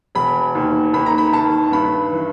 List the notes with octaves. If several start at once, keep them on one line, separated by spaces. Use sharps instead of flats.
E1 B5
D#2
D#2 B5
A#5
B5
D#3 A5
G2 B5
E3